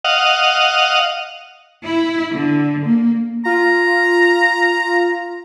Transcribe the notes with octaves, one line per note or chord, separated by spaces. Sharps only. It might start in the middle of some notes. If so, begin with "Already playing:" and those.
D#5 F5 F#5
E4
D3
A#3
F4 A#5